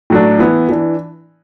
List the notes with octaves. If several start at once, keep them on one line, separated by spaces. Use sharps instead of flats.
A2 F#3 D4
E3 B3 E4
E3 D4